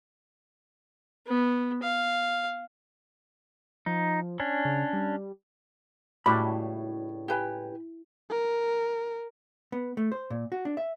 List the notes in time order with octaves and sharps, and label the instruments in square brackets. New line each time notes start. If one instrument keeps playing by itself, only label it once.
[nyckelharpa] B3
F5
[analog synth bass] F3 [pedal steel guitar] D#4
[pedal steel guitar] C#4 D4
[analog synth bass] C#3
G3
[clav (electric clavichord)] C#2 G3 D4 [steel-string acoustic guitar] A2 [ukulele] E4 F#4 E5 [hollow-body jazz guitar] B5
[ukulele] G4 B4 G#5
[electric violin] A#4
[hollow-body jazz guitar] B3
A3
C5
A#2
F#4
D4
E5